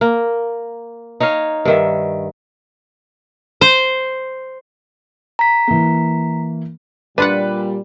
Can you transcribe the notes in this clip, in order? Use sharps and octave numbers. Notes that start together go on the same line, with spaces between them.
A#3
D#4 C#5 D#5 F5
G2 D#3 E5
C5
A#5 B6
E3 A#3
A#2 G3 D4 F4 B4 F#5